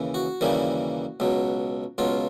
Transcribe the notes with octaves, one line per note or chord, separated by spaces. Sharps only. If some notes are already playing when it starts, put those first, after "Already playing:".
Already playing: D#2 C#3 E3
F#4
D#2 C#3 E3 G3 A#3
C#2 B2 F#3
C#2 B2 F#3 F4